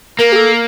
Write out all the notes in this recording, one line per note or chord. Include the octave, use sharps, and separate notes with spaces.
A#3 A#4
G4
A4